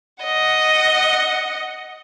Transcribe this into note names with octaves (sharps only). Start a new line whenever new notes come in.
D#5 F#5